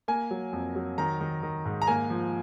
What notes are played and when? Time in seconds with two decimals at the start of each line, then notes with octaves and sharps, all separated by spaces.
0.08 A#3 G#5
0.31 F#3
0.53 F2
0.76 F#3
0.98 D#3 A#5
1.21 D#3
1.43 D#3
1.65 G#2
1.82 A#5
1.87 A#3 G#5
2.10 F3